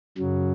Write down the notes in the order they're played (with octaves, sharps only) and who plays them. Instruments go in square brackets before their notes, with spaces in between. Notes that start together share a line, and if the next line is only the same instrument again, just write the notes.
[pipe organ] F#2 C#3 F#3